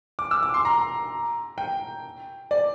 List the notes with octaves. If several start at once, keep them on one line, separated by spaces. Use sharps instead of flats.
D6
E6
D6
C6
A#5
G5
D5